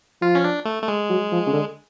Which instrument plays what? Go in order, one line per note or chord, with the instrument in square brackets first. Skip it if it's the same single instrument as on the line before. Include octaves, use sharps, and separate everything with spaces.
[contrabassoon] F3 [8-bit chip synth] F4
[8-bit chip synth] C#4
D4
A3
A3
G#3
[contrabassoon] F#3
F3
C#3
D3